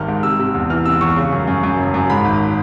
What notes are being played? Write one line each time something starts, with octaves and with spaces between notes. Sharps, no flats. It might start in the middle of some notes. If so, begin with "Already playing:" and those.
Already playing: G#1 D#3 G3 F6
G#2
C3 E6
C3
E2
E3 F6
C3 E6
E2 C#6
C#3
F#2
F#2
F#2
F#1
F#2
G#2 B5
G#1